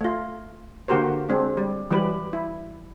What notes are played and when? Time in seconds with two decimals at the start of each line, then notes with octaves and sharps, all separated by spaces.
0.01 A3 F4
0.88 D3 A#3 F#4 G4 A#4 C5
1.29 G#3 C4 D4
1.57 G3
1.91 E3 F#3 G3 B4
2.33 E4